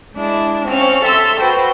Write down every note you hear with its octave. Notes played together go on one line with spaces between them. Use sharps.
G#3 D4 E4
C4 C#4 F5
A4 E5 C6 E6
F#4 B4 C5 G5